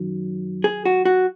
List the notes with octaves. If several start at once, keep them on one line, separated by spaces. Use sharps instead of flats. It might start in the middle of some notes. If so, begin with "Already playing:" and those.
Already playing: F#2 D#3 F#3
G#4
F#4
F#4